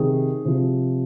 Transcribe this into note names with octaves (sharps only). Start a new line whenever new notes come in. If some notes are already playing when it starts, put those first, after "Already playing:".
Already playing: C3 D#3 G#4
C3 F3